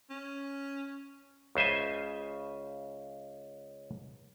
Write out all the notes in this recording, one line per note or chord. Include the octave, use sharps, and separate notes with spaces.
C#4
C#2 C#3 C5 E5 G#5